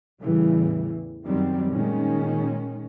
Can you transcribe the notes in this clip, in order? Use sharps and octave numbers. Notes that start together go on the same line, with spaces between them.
E2 A2 C#3 E3 G3
F#2 D#3 F#3 G3 C4
A#2 D#3 G#3 C#4